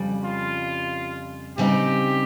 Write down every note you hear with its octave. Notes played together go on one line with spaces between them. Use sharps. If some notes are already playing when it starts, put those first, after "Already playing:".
Already playing: F2 C#3 G3
F4
C#3 G3 C4 D#4 G4